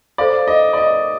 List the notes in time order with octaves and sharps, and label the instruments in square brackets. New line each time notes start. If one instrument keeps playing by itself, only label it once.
[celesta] A4 C5 F5 [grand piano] D5
[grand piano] D#5
D5
D#5